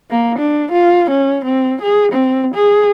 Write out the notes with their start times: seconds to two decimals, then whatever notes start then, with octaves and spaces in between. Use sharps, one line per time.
0.10 A#3
0.39 D4
0.72 F4
1.10 C#4
1.45 C4
1.82 G#4
2.12 C4
2.54 G#4